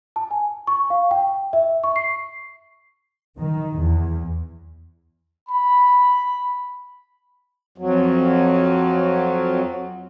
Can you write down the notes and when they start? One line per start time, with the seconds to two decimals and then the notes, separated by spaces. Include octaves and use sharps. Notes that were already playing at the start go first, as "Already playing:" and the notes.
0.16 A5
0.31 G#5
0.67 C#6
0.90 F5
1.11 G5
1.53 E5
1.84 C#6
1.96 C7
3.39 D#3
3.79 E2
5.48 B5
7.78 F2 F#3